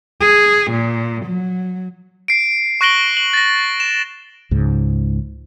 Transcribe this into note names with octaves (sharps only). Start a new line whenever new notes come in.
G#4
A#2
F#3
C7 D7
C#6 F#6 A#6 D7 F#7 G7
F#7
A6 A#6
E7
C#2 G#2